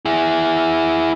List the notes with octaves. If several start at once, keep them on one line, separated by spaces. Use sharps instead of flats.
E4 G#4